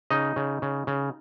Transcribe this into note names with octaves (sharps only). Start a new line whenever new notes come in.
C#3 D#4 D#5
C#3
C#3
C#3